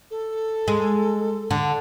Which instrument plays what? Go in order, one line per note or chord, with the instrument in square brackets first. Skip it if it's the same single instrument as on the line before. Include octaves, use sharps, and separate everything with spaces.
[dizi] A4
[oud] G#3
D3